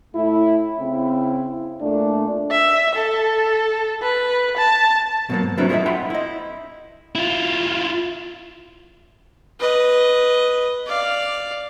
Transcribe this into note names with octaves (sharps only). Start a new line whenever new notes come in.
A2 A3 E4
C#3 C4 E4
A#2 A3 D4
E5
A4
B4
A5
B2 F#3 A#3
G#2
F#3 B3 C4 D4 E4 B4
E4 F4 G#4 A4 D#5 E5
E5 F#5 G5 B5 C6
E4 D#5
E4 F4
B4 D#5
D5 F5